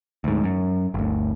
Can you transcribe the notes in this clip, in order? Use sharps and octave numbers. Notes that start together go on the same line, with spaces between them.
D2 G#2
F#2
G1 D2